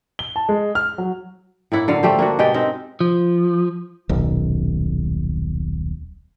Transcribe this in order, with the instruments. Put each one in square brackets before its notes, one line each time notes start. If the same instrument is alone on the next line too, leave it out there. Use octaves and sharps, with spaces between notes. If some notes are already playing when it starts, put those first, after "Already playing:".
[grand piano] G7
A5
G#3
F6
F#3
[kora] A2 A#3 E4 F#5
D3 F#3 F5
G3 A3 G4 C5
A#3 D4 F#4
B2 G#3 G4 G5
C4 D#4 A#4
[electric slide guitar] F3
[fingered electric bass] D#1 B1